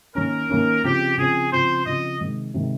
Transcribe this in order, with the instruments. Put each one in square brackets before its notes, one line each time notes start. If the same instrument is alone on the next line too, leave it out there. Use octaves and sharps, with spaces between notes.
[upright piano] D#3 A#3 C#4 [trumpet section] A#4
[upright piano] D#3 A#3 C#4
[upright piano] C#3 F3 C4 [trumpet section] G4
[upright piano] C#3 F3 C4 [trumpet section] G#4
[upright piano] C#3 F3 C4 [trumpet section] C5
[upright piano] C#3 F3 C4 [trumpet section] D#5
[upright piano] C3 D#3 G#3
C3 D#3 G#3